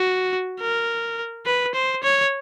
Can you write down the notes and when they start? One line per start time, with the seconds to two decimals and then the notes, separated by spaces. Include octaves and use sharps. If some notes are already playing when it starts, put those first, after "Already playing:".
Already playing: F#4
0.60 A#4
1.46 B4
1.75 C5
2.03 C#5